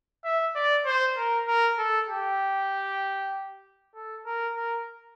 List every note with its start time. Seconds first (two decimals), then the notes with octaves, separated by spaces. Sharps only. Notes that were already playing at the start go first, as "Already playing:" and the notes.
0.25 E5
0.55 D5
0.86 C5
1.17 A#4
1.48 A#4
1.78 A4
2.09 G4
3.95 A4
4.26 A#4
4.56 A#4